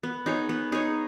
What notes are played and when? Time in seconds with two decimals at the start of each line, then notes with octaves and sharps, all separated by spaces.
0.03 B3
0.26 D#4 G#4 C#5
0.49 B3
0.72 D#4 G#4 C#5